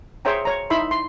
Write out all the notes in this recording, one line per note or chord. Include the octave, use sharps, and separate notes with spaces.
G#4 C5 C#5 E5 G5 A#5
C#5 A#5
D#4 E4 E5 B5 C6
C6